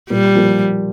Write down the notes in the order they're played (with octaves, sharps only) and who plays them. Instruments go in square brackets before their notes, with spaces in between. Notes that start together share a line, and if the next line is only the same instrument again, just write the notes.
[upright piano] A#2 [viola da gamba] G3
[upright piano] F3 A#3